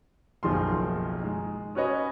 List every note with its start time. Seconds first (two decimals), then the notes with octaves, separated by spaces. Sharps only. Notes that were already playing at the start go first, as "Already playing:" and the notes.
0.43 F#1 B1 D#3 F3 G#4 C6
1.22 G#3 D#4
1.75 C#4 F#4 B4 C#5 D#5